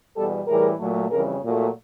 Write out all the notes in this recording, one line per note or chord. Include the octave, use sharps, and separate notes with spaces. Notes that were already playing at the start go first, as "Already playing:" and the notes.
E2 B2 G3 G4 A4
A2 E3 G3 G#4 A#4
A#2 F#3 A3
F2 C#3 E3 G3 G#4 A#4
A#2 F#3 A3